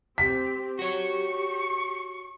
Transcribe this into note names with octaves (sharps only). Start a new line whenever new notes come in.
C4 G4 B6
F#4 G4 C#5 C#6